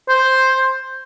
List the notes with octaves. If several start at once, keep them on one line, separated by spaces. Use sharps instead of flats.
C5